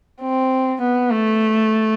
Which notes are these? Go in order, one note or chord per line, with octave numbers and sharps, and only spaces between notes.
C4
B3
A3